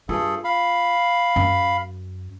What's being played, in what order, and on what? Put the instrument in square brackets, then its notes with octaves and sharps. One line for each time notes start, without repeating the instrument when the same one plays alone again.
[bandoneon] G2 G#4 A4 [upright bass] F4
[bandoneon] F5 B5
[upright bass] F#2